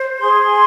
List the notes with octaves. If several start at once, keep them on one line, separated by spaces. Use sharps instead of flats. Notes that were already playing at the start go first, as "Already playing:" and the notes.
Already playing: C5
G#4 C6